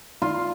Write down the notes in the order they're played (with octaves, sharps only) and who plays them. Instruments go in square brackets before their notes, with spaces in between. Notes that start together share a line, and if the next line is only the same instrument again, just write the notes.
[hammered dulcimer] F4